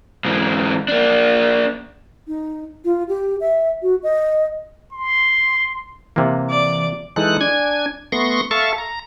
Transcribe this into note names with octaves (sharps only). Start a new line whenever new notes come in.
G#2 E3
A#3 D4
D#4
F4
G4
E5
F#4
D#5
C6
C3 E3 A#3
D5
E3 G#3 D#4 A4 F#6
D4 G#5 G#6
A3 B3 C6 C#6 A#6
A4 E5 F5 A5 C#6
A#5